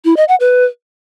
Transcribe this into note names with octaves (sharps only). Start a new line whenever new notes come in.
E4
D#5
F#5
B4